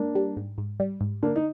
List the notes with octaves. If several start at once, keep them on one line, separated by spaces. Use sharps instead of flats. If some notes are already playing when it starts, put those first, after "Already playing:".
Already playing: G#2 A#3 D4
G3
G#2
G#2
G3
G#2
D3 A#3 D4
D#4